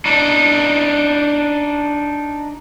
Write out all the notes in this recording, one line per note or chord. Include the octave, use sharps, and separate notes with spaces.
D4 D#4